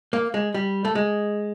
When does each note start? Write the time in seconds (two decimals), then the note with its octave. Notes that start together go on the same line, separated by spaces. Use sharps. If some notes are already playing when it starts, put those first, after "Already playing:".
0.13 A#3
0.34 G#3
0.54 G3
0.85 A3
0.95 G#3